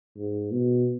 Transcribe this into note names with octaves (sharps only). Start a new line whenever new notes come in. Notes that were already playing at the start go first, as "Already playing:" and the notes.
G#2
B2